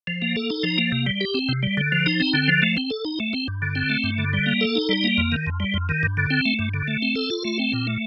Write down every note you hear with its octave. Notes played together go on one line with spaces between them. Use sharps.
F3
A#3
A4
D#4
F3
A#3
C3
G3
G4
C4
C3
G3
D3
F3
D#4
C4
D3
F3
A3
C4
A4
D#4
A3
C4
G2
D3
C4
A3
G2
D3
G3
A#3
A4
D#4
G3
A#3
F2
D#3
F2
G3
F2
D#3
G2
D3
C4
A3
G2
D3
A3
C4
A4
F4
A3
C4
A#2
A3